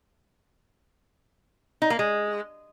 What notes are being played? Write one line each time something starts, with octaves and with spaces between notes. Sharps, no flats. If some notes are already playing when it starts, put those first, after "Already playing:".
D#4
A#3
G#3